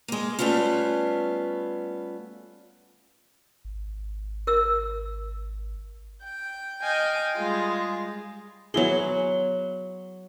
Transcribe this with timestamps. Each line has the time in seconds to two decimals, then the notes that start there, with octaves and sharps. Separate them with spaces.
0.08 G#3 A#3
0.39 G3 A3 B3 C#4 F4
3.65 G#1
4.47 A#4 E6
6.24 G5
6.83 D#5 F5 G5 G#5
7.35 G3 G#3 F4 G#4
8.74 F#3 B3 E4 G#4 C6